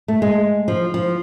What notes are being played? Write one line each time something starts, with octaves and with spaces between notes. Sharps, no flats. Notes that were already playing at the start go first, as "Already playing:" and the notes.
A3
G#3
F3
F3